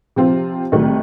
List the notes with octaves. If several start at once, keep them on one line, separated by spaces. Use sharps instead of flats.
C3 F3 C4 F4
C2 C3 D#3 F#3 A3